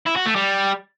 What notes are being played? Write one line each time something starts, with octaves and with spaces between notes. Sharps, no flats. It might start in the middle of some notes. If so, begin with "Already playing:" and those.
E4
F#4
A3
G3